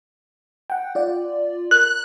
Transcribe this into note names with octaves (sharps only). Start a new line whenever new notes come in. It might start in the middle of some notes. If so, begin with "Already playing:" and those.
F#5 G5
F4 D5
A#4 F#6